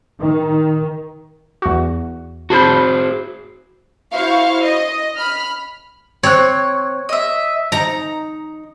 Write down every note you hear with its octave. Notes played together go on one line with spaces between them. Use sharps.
D#3
E2 F#4
F#4 G#4 C5 A5 B5 G6
E4 F#4 C5 F5 C#6
D#5
B5 F6
C4 C#5 F#6
D#5 E5
D#4 A#5